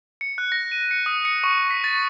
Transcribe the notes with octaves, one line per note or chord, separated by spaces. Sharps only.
C#7
F#6
A#6
D#7
C#7
D#6
C#7
C#6
B6
A6